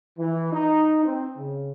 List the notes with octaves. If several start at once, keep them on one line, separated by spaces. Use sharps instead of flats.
E3
D#4
C4
C#3